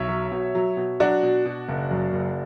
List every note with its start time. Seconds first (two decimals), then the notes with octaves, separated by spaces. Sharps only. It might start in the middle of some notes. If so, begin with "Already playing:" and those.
Already playing: B1 C#5 E5
0.08 F#3
0.32 B2
0.55 F#3
0.77 B2
1.00 F#3 D4 F#4
1.23 B2
1.45 B2
1.69 F#1
1.91 F#2
2.13 F#1